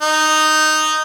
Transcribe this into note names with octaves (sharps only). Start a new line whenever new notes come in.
D#4